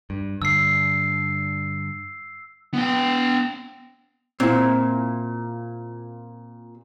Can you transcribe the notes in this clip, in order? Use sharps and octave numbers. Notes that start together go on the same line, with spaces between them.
G2
G2 D3 E6 C7
B3 G5
A#2 C4 E4